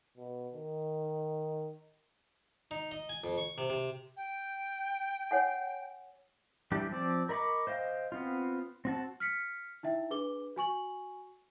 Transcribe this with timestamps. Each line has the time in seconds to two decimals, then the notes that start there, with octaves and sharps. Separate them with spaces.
0.18 B2
0.54 D#3
2.71 D#4
2.91 D#5
3.09 G#5
3.24 F2
3.38 C#6
3.58 C3
3.70 C3
4.17 G5
5.31 C#5 F#5 G#5
6.72 E3 G3 D4 G4
6.91 F3 C4 D5
7.29 A#4 D#5 B5 C#6 D6
7.67 C5 D#5 F5 G5
8.12 B3 C4 F4
8.85 C4 F#4 A5
9.20 F6 B6 C#7
9.83 D#4 E4 E5 G5
10.10 D4 G#4 B4 D6 G7
10.56 F#4 G#5 C#6 F#7